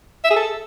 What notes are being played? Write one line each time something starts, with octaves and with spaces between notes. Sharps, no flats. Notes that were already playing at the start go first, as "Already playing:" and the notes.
E5
G#4
A4